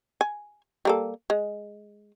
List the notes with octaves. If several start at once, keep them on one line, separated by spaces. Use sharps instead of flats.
G#5
G3 A#3 A4
G#3